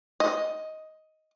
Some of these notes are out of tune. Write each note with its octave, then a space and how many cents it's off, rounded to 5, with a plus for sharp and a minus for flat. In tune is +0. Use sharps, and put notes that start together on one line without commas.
D#5 +10